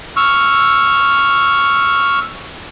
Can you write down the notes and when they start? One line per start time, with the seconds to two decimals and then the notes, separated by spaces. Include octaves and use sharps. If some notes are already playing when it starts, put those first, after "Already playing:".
0.17 C#6 E6 F6